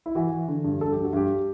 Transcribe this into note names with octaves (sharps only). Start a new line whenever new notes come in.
E4
E3 F#4
E3
D3
G2
G2 A4
G2 G4
F#4
G2 G4